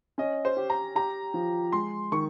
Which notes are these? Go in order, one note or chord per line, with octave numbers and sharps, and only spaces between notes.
C#4 D#5
C5
G4
A#5
G4 A#5
F3
G#3 C6
D#3 C#6